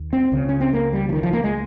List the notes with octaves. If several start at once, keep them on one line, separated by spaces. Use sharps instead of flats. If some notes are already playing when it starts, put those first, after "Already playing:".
Already playing: D#2
C4
C#2 C#3
C#4
C4
A#3
G3
F3
D#3
F3
A#3
G#3